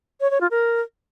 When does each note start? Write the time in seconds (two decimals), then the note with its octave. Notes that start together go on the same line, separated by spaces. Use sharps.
0.21 C#5
0.31 C#5
0.41 F4
0.51 A#4